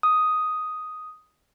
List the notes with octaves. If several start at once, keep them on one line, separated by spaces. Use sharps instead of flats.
D#6